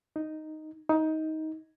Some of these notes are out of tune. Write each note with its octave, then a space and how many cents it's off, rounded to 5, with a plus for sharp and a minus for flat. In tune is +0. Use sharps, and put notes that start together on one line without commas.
D#4 +0
D#4 +20